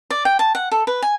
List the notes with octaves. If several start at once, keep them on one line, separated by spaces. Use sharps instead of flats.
D5
G5
A5
F#5
A4
B4
G#5